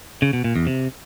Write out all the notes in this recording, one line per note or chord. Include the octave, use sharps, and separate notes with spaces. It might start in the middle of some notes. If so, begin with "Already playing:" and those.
C#3
B2
A#2
E2
C3